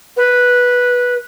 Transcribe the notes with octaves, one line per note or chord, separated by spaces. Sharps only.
B4